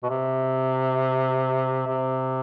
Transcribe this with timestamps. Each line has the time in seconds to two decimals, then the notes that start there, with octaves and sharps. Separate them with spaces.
0.03 B2
0.09 C3
1.87 C3